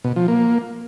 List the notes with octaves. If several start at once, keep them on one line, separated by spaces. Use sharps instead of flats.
B2
F3
A#3